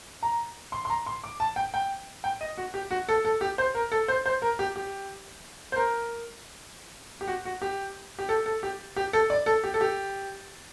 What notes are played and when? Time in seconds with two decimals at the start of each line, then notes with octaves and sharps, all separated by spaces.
0.23 A#5
0.72 C6
0.85 C6
0.90 A#5
1.06 C6
1.24 D6
1.40 A5
1.56 G5
1.74 G5
2.24 G5
2.41 D#5
2.58 F#4
2.74 G4
2.91 F#4
3.09 A4
3.25 A4
3.41 G4
3.58 C5
3.75 A#4
3.92 A4
4.08 C5
4.26 C5
4.42 A#4
4.59 G4
4.76 G4
5.72 C5
5.76 A#4
7.21 G4
7.28 F#4
7.45 F#4
7.62 G4
8.19 G4
8.29 A4
8.46 A4
8.63 G4
8.96 G4
9.13 A4
9.30 D5
9.46 A4
9.64 G4
9.74 A4
9.81 G4